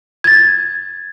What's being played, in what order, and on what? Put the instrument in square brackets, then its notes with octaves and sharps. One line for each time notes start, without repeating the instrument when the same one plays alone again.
[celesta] G#6 A6